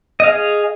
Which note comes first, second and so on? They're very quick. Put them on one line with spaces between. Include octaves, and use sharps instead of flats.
D#5 F5 G#4